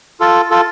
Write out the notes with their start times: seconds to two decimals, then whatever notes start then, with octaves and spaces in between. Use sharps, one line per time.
0.20 F4 A4
0.51 F4 A4